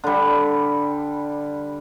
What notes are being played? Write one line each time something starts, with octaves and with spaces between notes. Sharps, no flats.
D3 G3